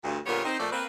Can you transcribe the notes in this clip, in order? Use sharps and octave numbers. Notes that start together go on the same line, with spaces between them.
D2 G2
A#2 D3 G3 B3 A#4 C#5
C4 D#4 C5
A#2 F3 A3 A4 D5
A#3 C4 B4